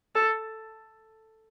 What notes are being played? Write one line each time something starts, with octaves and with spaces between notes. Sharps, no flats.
A4